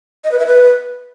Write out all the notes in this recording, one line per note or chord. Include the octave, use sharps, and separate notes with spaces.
D#5
B4
E5
B4